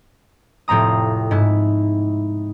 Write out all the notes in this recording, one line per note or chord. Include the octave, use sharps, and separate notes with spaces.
F1 A2 C4 A#5 D#6
G#2 E4